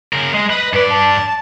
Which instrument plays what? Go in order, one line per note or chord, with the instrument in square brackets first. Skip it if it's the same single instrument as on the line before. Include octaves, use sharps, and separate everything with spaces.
[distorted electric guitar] C#3 A#4
[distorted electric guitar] G#3 [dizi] D#5
[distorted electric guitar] B4 B5 [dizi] D#5
[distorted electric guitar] G2 D5 [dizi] B4
[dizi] A5